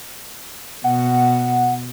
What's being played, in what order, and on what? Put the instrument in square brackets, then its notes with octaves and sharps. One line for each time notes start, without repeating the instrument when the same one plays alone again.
[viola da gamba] B2 [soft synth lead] F#5